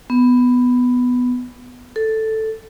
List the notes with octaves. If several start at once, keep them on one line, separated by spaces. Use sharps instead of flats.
B3
A4